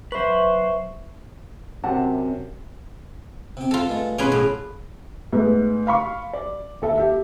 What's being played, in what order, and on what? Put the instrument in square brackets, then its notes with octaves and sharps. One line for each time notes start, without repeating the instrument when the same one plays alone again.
[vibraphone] F#3 E5 C#6 [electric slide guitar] B4 C5
[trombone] F#2 [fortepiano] C3 [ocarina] C4 [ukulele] D5 F#5 A5
[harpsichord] C3 G4
[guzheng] F4 A4
[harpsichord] G2 G#3 A3
[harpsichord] B1 C6 D6 [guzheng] C#4 G#4 B4
[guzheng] A2
[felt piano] G#2 A3 B3
F5 B5 C#6
D5
D#2 A4 E5
G4 E5